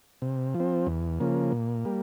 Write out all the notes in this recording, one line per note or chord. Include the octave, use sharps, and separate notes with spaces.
C3
F3
C4
E2
C#3 F3 A#3
A#2
G3 A#3